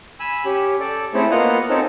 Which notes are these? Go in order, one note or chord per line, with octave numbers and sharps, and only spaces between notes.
G#5 B5 E6
C#4 G4
A4 D5
A3 C4 C#4 E4 G#4 A4
A#3 B3 F4 D#5 F5 F#5
C4 C#4 D#4 A4